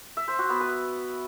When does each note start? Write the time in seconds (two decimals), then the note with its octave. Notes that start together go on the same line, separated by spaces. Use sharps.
0.17 E5
0.28 C5
0.39 F#4
0.50 B3
0.61 B4